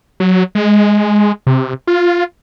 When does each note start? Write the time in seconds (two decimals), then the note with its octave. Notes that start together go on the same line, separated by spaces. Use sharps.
0.20 F#3
0.55 G#3
1.47 C3
1.87 F4